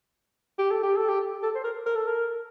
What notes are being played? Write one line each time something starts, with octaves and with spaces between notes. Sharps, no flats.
G4
A4
G4
A4
G4
A4
C5
A#4
A#4
A4
A#4